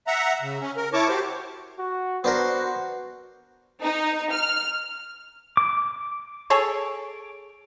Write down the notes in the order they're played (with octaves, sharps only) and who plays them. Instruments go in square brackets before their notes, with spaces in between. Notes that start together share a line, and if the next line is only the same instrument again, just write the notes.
[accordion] E5 F#5 A#5
C#3
C#4
A#4
E4 C#5 A5 C#6 D6
F#4 G4 C5
[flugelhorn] F#4
[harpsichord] B3 D4 A#4 [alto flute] F#4 [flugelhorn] C5
[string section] D#4
F6
[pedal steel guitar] D6
[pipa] G#4 A4 C#5